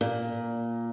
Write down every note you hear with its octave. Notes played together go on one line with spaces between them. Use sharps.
A#2